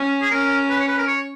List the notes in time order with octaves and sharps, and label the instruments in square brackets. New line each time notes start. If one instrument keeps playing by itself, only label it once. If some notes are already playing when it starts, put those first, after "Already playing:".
Already playing: [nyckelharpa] C#4
[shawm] G#4
[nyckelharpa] C#4 [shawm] A#4
[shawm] B4
C#5
B4
A#4
C#5